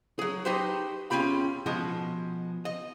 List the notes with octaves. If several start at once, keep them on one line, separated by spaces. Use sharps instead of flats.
F#3 G#4
D#4 F#4 G4 B4 C5
E2 C#4 F4 G4 B5
B2 F3 G#3 F#4 D#5
D#5